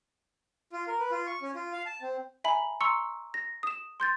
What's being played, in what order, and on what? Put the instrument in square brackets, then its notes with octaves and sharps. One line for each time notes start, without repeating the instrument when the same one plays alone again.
[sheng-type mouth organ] F4
A#4
B4
F4
C#6
C#4
F4
F5
A5
C4
[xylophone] E5 G#5 A#5 B5 F#7
A#5 C6 C#6 E6 C#7
A#6
D#6 E7
C6 G6 A6